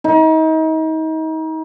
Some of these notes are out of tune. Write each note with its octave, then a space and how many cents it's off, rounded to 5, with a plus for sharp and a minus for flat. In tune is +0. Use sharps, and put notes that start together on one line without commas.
D#4 +35